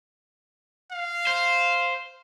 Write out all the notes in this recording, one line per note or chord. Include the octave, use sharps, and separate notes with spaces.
F5
C5